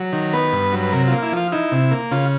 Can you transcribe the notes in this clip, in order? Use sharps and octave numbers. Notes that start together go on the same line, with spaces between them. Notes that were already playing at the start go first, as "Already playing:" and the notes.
Already playing: F#3
D#3
B3 B4
G2
F#3
B4
C3 A#4
A#3 F4
E4
F3 F4
D#4 E4
C3
A#3
C#3 F4